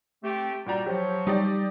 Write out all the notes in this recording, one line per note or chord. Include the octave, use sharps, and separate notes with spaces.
A3 C4 G4
A#2 G3 F#4 A#5
F3 F#3 G4
G3 D#4 G4 D5